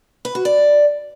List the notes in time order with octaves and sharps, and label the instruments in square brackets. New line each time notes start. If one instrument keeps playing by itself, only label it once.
[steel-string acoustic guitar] B4
F#4
D5